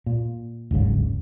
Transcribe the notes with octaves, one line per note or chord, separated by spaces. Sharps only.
A#2
D1 G1 G#2 C#3